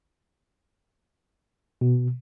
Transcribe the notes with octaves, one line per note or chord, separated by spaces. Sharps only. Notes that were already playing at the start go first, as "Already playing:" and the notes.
B2